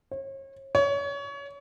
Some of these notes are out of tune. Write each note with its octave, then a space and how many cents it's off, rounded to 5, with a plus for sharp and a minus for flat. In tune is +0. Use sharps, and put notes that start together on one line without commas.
C#5 -40
C#5 +25